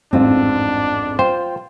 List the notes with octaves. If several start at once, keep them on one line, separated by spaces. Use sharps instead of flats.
A1 F2 G#2 C4 D4 F4
F4 C5 G5